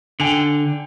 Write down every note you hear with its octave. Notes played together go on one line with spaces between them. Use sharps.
D3 G5 G#5 F7